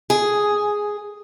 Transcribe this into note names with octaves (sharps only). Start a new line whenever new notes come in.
G#4